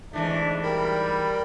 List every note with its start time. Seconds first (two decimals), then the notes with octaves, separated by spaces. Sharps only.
0.13 G#2 E3 A3 D4
0.63 G3 A#4 G5 B5